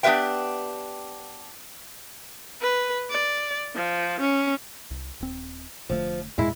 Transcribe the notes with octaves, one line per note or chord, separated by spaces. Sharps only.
B3 D4 G4 B4 E5 G5
B4
D5
F3
C#4
C2
D#1 C4
F1 D3 F3 A3
E2 G2 A#2 G#3 E4